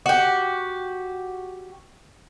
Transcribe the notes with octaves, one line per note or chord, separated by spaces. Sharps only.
F#4 G4